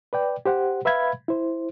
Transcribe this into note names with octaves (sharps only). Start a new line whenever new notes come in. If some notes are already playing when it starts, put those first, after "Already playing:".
B4 D5 G5
G4 C5 F#5
B4 E5 F5 B5 G#6
E4 C5